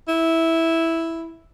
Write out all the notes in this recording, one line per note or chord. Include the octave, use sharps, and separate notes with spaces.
E4